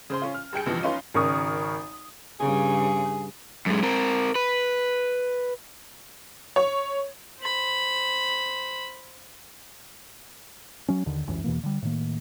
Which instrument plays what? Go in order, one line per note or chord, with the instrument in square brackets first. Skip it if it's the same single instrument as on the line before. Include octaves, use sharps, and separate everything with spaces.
[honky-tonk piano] C#3 C5 C6
C#4 F4
F6
G2 G#4 G5 C#7
C#2 G2 B2 E3 F3
C#4 D#4 F4 B4 C6
G#1 C#3 A#4 C#6 D#6
[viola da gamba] G2 C#3 [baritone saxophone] G#4
[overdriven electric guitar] F#2 G#3
C4 A#4
B4
[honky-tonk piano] C#5
[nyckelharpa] C5 B5
[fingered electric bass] F#3 C#4
D#2 D3 D#3
G1 C#2 F#2 E3
E2 B2 E3 A#3
D3 G3
A2 D#3 A#3